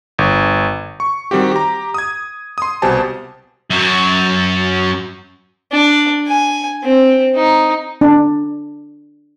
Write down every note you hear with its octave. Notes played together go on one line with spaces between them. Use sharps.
G1
C#6
D#3 G3 C4 F#4 G4
G4 A#5
D#6 G#6
C6 D#6
C2 B2 G4 C5 G#5 A5
F#2 F#3
D4
G#5
C4
D#4
D4